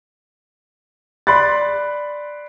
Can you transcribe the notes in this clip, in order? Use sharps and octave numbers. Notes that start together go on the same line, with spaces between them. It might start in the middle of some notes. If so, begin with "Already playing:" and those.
D5 B5 C6 F#6 A6